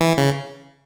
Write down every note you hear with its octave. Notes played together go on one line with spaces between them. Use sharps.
E3
C#3